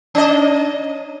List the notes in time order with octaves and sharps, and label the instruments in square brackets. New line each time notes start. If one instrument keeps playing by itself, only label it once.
[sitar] C#4 D#5